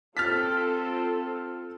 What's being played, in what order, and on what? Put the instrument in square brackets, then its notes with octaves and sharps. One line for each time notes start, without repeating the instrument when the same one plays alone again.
[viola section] C4 F4 A4 [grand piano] F6 A6 B6